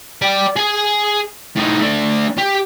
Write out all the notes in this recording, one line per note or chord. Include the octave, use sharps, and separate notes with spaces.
D5 G5
G#4 G#5
A2 D#4
A3 D4
G4